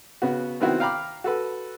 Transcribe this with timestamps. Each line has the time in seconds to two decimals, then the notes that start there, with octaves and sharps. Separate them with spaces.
0.22 C#3 B3 F#4
0.60 C3 D#3 B3 C4 E4 F#4
0.80 F5 G5 A#5 B5 D6
1.24 F#4 A4 B4